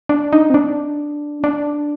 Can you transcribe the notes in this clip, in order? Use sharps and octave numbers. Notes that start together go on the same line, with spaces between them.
D4
D#4
C4
D4
D4